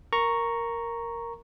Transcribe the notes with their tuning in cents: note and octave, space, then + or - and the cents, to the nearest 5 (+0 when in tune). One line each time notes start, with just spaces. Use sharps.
A#4 +0 A#5 +0 C#6 +0